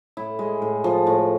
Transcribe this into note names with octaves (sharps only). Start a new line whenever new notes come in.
A2 E4
G#3
A2
F3
A2